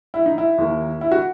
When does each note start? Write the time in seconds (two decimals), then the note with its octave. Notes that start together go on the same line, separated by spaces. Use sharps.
0.14 E4
0.26 D#4
0.38 E4
0.58 D#2 D#3 A#3
1.01 E4
1.11 F#4